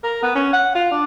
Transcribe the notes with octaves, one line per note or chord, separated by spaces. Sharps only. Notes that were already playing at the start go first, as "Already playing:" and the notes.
A#4
B3
C#4
F#5
F4
D4